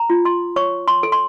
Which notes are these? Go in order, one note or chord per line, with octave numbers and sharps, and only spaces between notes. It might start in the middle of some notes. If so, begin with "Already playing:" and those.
Already playing: A#5
F4
C6
C#5 C#6
C6
A4
C6